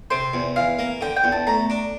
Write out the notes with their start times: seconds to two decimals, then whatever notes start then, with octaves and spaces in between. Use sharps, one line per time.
0.10 C3 C5
0.34 E2
0.56 E3 F5
0.79 A#3
1.01 D3 G5
1.16 G5
1.24 E2
1.32 A5
1.47 A3 A#5
1.70 D4